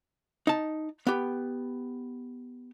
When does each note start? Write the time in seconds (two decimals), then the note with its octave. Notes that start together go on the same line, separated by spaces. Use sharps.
0.47 D#4 A5
1.07 B3 G4